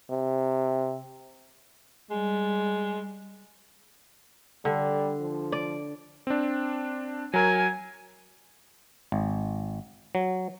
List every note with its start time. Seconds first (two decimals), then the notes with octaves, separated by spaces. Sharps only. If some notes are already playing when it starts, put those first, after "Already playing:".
0.10 C3
2.10 G3 G#3
4.65 D3 G3
5.20 F3
5.52 D5
6.27 C4 D4
7.34 F#3 A#4 G#5
9.12 G#1
10.15 F#3